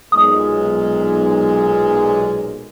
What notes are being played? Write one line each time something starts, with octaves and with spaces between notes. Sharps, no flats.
B1 A#2 G#3 D#6